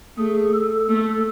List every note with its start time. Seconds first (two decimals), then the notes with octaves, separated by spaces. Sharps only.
0.18 A3 G#4
0.54 A4
0.88 A3 A4